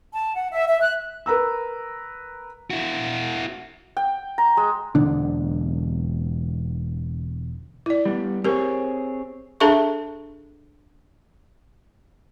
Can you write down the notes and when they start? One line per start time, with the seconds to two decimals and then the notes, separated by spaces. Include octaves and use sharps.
0.13 A5
0.36 F#5
0.52 E5
0.68 E5
0.80 F#6
1.26 A#4 B4 A#5 E6
2.71 E4 F#4
3.97 G5
4.38 A#5
4.57 G#3
4.95 E1 D3 D4
7.86 E4 D5
8.06 G3 B3
8.45 C4 G4 G#4 A#4 C#5
9.60 D4 G#4 A4 E5 A5 C#6